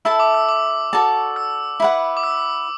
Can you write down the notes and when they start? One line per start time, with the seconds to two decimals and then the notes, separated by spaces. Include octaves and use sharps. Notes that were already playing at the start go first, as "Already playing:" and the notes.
0.05 E4 A4 E5 A5 E6
0.20 D6
0.34 E6
0.49 D6
0.93 F#4 A4 D5 A5
1.36 E6
1.80 E4 B4 F#5
2.17 D6
2.24 E6